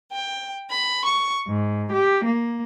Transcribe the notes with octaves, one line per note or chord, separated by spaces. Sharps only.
G5
B5
C#6
G#2
G4
A#3